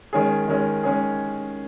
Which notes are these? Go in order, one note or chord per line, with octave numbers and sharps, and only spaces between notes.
D#3 G#3 C#4 G#4
D#3 G#3 C#4 G#4
D#3 G#3 C#4 G#4